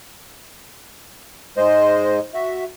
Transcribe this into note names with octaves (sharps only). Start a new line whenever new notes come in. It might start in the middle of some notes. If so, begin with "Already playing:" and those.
G#2 G#3 C5 D#5
F#4 E5